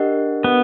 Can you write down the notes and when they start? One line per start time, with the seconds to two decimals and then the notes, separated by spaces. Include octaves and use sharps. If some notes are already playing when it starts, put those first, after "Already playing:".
Already playing: D4 G4 A#4 D#5 F#5
0.44 B3